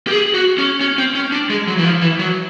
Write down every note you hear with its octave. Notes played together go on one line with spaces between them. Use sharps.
G4
G#4
F#4
C#4
C#4
C4
C#4
D4
G#3
F#3
E3
F3
E3
F#3